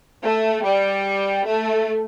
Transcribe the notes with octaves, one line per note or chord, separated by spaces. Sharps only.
A3
G3
A3